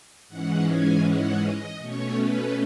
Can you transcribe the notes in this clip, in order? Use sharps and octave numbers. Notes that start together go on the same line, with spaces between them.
G#2 E3 G#3 C#4 F#5
G#5
F#5
D#5
B2 A3 C#4 C#5
B4